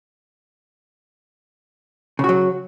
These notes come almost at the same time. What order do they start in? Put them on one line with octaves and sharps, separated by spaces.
C#3 F#4 F#3